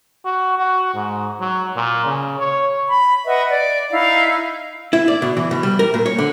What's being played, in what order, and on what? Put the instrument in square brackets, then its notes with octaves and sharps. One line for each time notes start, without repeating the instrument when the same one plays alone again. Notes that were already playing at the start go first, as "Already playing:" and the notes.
[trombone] F#4
F#4
G#2
F#3
A#2
C#3
C#5
[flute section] B5
B4 D#5 E5 F#5
D5
D#4 E4 F5
[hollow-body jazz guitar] E4
D5
B2
E3
B2
G3
A#4
A#2
C#5
D3